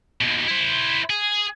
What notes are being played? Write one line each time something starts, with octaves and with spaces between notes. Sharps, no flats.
D#2 B2
E4 C5
G#4